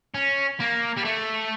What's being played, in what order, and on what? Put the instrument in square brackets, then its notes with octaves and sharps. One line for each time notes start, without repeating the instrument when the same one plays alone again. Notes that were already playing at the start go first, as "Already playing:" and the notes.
[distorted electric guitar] C#4
A#3
G3
A3